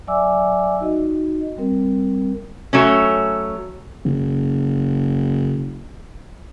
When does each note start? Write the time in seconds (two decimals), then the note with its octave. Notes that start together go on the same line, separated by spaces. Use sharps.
0.07 F#3 D5 E5 G#5 D6 E6
0.80 D#4 F#4 D#5
1.58 G3 C4 A#4
2.73 F#3 A3 C#4
4.05 F#1 C#3